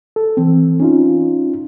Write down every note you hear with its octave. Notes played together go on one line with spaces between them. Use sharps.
A4
E3 C4
C#4 D#4 F4